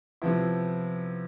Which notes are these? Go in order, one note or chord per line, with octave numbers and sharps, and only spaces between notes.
C3 F3 B3 E4